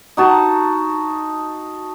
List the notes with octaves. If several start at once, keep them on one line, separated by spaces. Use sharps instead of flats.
D#4 F#4 A5